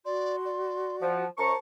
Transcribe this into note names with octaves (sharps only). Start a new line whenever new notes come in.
F#4 D5 C6
D5
F3 F#5
F#2 C5 A5 A#5 C#6